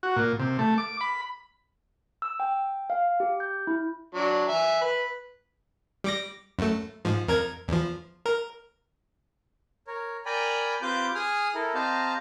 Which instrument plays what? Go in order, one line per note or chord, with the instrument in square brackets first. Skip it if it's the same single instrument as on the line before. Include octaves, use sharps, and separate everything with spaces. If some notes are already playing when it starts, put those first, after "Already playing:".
[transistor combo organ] F#4
A#2
C3
A3
D6
B5
[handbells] E6
G5
F5
G4
G6
E4
[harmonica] F#3 D4
E5 G#5
B4
[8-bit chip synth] G3 D6 A#6
F#2 A3
G#2 F3
F2 A#4 G#6
E2 F3
A#4
[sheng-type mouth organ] A#4 C#5
A#4 D5 G5 G#5 A#5 B5
C4 F4 G4 B4 D6 G6
G#4 G#5 D#6 F6
E4 A4 A#4
C4 G4 D#5 F5 A5 A#5